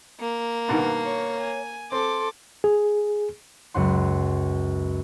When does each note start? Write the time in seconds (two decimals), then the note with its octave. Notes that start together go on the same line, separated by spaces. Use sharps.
0.20 A#3
0.69 G2 B2 D#3 F#5
1.05 C#5 C#6
1.40 G#5
1.92 C4 A4 C6 D6
2.64 G#4
3.74 C#2 F#2 F#5 C6